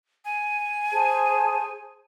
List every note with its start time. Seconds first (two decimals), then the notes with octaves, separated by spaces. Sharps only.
0.25 G#5
0.92 G#4 C5 A5